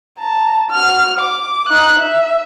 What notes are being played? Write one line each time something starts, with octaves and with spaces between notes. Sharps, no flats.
A5 A#5
F#4 F6
D6
D#4 F#6
E5